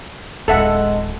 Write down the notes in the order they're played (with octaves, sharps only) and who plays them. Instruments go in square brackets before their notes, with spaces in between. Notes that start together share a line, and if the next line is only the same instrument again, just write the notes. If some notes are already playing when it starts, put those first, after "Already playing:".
[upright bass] D1 A1 [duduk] G#3 [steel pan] A4 E5 F#5